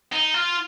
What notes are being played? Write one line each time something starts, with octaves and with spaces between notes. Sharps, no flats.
D#4
F4